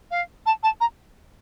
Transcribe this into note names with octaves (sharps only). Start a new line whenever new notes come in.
F5
A5
A5
A#5